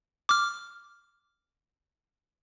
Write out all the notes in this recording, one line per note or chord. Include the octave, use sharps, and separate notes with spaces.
D6 F6